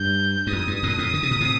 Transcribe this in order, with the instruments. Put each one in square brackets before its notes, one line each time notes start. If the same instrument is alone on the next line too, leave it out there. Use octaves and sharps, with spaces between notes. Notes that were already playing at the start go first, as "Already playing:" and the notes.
Already playing: [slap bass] G2 [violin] G6
[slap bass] G2
[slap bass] F2 [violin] D#6
[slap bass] G2
G2 A#2
F2 A2
D3
C3
A#2
A2 C3